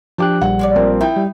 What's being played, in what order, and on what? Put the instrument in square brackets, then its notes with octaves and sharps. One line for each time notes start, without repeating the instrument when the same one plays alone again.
[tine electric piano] F3 D6 F#6 [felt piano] D4 G4 G5
[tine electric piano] A#1 G3 [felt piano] F#5
[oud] G#3 C#5 D5
[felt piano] F3 A#3 C4
[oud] D#4 [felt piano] E4 G5
[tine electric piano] G3